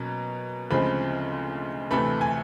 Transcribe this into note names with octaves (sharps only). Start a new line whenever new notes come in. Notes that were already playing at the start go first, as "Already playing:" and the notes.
Already playing: B2 F#3 A#3 C#4 A#5
D2 C#3 F3 G#3 C4 B5
D2 C3 E3 A3 B5
G#5